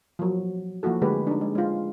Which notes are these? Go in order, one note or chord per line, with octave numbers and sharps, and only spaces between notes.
F3 F#3
F3 A#3 E4 F#4 A4
D3 G#3 A3 G4 G#4 B4
D4 D#4
G#3
G#3 F4